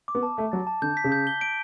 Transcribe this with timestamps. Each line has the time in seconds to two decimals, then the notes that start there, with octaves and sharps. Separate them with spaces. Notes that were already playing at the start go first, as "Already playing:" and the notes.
0.08 D6
0.15 B3
0.23 A5
0.37 A3 D6
0.52 F#3 A6
0.67 A5
0.82 D3 G6
0.97 B6
1.04 C#3
1.12 G6
1.27 G7
1.41 D7